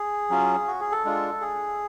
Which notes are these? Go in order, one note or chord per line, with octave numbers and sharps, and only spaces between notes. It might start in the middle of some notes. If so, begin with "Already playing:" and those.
Already playing: G#4
F#3 C#4 F4
F#4
G#4
A4
G#3 D4 F4
G#4